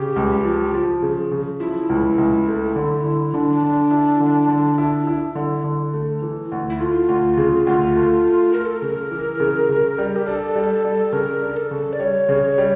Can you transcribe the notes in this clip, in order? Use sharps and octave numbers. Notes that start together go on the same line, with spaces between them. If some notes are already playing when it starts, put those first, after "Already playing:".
Already playing: C#3 G4
C#2
F3
F3
C#3
C#3
F3 E4
C#2
C#2
A3
D3
D3
D3 D4
D3
E4
D3
D3
E4
E4
D3
D3
A3
E3
D2
E4
A3 F4
D2
C#3
D2 F4
A3
A3
A3 A#4
A4
A#4
C#3
E3
C#3
C#3
G3
G4
D4 A4
G3
G3
C#3 A#4
D4
A4
C#3
D5
G3 C#5
C#3
G3